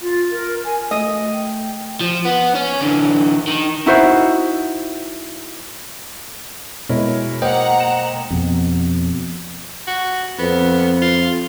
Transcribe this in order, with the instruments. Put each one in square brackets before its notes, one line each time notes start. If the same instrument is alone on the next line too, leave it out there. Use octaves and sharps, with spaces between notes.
[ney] F4
A#4
G#5
[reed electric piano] A3 [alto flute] F#4 [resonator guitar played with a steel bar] D#5
[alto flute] G5
[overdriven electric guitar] F3
B3
C#4
D3 E3
D#3
[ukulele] D#4 E4 F#4 C5
[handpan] B2 G#3 [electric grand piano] E4 A#4 C#5
[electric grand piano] A#3 [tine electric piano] C5 D#5 G5 [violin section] F#5 A#5
[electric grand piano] E7
[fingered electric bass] F2 B2
[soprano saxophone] F#4
[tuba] F2 [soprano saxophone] B3
[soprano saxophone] F4